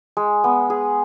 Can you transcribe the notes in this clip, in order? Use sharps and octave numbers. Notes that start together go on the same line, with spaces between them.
G#3
B3
G#4